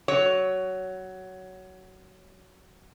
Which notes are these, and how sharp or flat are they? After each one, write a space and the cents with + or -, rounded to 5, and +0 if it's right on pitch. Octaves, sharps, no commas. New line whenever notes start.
F#3 +15 C#5 +15